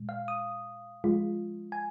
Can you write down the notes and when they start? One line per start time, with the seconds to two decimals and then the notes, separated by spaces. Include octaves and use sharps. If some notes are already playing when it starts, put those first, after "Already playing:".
Already playing: A#2 G#3
0.09 F5
0.28 D#6
1.04 F3 G#3 F4
1.72 G#5